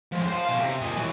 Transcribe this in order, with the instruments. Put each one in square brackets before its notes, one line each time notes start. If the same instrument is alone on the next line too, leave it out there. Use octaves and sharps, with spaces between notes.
[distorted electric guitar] F3 G#3
C5 F5
B2 F5
C3
A#2 D#5
E3 F#3